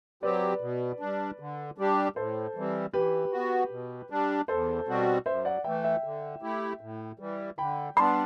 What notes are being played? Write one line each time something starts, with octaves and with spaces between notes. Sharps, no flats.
F#3 C4 G4 B4 D5
B2
G3 D4
D3
G3 D4 G4
A2 A4 C5
E3 G3 C4
E3 G4 B4
B3 F#4
B2
G3 D4
E2 A4 C5
B2 G3 C4 F#4
F#2 C5 E5
D5 F#5
E3 A3 E5 G5
E5 G5
D3
A3 E4 G4
A2
E3 G3
D3 G5 B5
G3 B3 D4 A5 C6